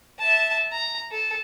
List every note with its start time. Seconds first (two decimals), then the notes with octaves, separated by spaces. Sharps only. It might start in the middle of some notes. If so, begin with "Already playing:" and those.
0.19 E5 A5
0.72 A#5
1.11 A4